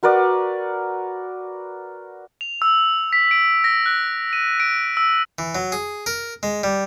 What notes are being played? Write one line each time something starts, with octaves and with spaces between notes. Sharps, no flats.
F#4 A#4 B4 D5
F7
E6
B6
D7
A#6
F#6
D#7
D7
E6
E3
F#3
G#4
A#4
G#3
G3